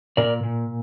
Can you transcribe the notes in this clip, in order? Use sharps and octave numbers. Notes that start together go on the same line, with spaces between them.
A#2 A#4 D5
A#2